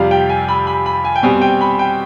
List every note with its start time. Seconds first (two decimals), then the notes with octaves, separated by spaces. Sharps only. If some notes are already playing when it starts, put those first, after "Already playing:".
Already playing: F2 C3 G3 D5 F5
0.11 G5
0.30 G#5
0.48 B5
0.67 B5
0.86 B5
1.05 G#5
1.16 G5
1.23 B2 G3 C4 G#5
1.42 G5
1.61 B5
1.79 G5